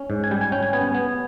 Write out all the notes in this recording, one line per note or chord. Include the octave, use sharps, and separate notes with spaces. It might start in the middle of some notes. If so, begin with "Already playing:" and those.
Already playing: C#4
G#2
G#5
G3 G5
G#5
C#4 G5
G#5
B3 G#5
B3